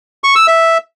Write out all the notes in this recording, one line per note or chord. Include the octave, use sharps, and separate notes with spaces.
C#6
E6
E5